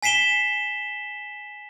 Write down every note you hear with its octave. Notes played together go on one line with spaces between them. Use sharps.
G#5 B6 C7 E7 G7